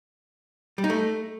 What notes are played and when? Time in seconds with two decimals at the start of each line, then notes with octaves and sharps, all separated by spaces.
0.78 G3
0.84 D#4
0.90 A3